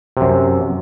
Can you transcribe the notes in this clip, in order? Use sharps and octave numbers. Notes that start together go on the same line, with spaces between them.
F#2 C3